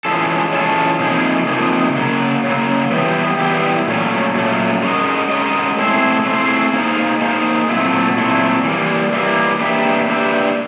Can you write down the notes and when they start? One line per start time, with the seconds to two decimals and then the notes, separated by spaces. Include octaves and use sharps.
0.05 E3 G#3 C#4 F4 A4
0.53 E3 G#3 C#4 F4 A4
1.00 C3 F3 A#3 D#4 G#4
1.48 C3 F3 A#3 D#4 G#4
1.95 C#3 F#3 A#3
2.44 C#3 F#3 A#3
2.91 E3 G3 B3 E4 G4
3.39 E3 G3 B3 E4 G4
3.87 A#2 F#3 A3 C#4
4.35 A#2 F#3 A3 C#4
4.83 G#3 C#4 F#4 A#4 D#5
5.30 G#3 C#4 F#4 A#4 D#5
5.79 A3 C4 E4 G#4 C5
6.26 A3 C4 E4 G#4 C5
6.74 A#3 D#4 G#4 C5 F5
7.22 A#3 D#4 G#4 C5 F5
7.69 A#2 F#3 A3 C4 E4
8.18 A#2 F#3 A3 C4 E4
8.64 E3 G3 A#3
9.13 E3 G3 A#3
9.60 A#3 D4 G4 B4 E5
10.08 A#3 D4 G4 B4 E5